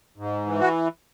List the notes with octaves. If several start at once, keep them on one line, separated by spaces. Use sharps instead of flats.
G#2
E3
F#4